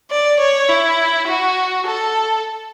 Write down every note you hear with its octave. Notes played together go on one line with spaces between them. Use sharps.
D5
C#5
E4
F#4
A4